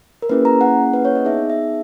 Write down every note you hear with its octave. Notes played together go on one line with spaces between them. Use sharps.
A#4
A#3 C#4 E4 G#4 B4
A#5
F#5
B4
C#5
D#5
B3 D#4 G#4 E5
E5